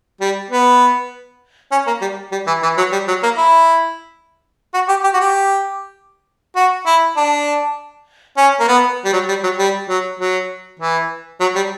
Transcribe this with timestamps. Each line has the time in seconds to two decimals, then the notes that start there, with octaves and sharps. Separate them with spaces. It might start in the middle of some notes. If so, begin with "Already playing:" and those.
0.21 G3
0.51 B3
1.72 C#4
1.87 A#3
2.01 G3
2.32 G3
2.47 E3
2.63 E3
2.77 F#3
2.92 G3
3.08 F#3
3.23 A#3
3.38 E4
4.74 F#4
4.89 G4
5.04 G4
5.14 F#4
5.20 G4
6.56 F#4
6.86 E4
7.17 D4
8.37 C#4
8.60 A#3
8.68 B3
9.05 G3
9.13 F#3
9.29 G3
9.44 F#3
9.59 G3
9.89 F#3
10.20 F#3
10.79 E3
11.40 F#3
11.55 G3